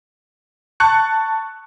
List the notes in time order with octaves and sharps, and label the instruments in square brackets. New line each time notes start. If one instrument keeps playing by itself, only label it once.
[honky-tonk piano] A5 C#6 F#6 C#7